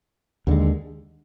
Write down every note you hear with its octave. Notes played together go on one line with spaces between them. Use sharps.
D#2 D3 G#3